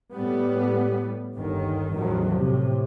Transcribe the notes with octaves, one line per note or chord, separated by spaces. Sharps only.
A2 G3 B3
G1 D#2 D#3
A1 E2 D#3 F3 F#3
A2 C3